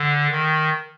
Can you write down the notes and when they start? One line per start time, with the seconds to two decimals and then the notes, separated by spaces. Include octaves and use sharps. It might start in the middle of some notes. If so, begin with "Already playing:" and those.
Already playing: D3
0.31 D#3